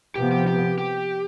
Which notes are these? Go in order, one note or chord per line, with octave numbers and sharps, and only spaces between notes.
C3 F3 B3 G4
G4
G4
G4